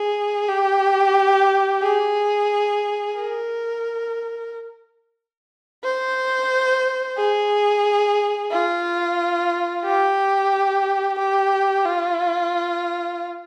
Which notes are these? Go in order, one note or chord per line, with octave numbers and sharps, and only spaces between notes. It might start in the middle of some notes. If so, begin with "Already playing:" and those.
Already playing: G#4
G4
G#4
A#4
C5
G#4
F4
G4
G4
F4